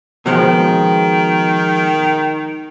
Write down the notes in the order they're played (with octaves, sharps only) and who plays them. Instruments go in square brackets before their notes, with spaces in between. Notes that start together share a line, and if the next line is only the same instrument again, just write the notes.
[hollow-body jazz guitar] B2 F3 G#3 [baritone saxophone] D#3